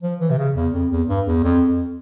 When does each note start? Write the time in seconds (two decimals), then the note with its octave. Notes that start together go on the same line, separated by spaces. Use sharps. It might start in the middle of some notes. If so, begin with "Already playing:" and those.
0.03 F3
0.20 E3
0.30 C3
0.38 C#3
0.56 E2
0.73 F2
0.91 E2
1.08 G2
1.26 E2
1.44 F2
1.67 F2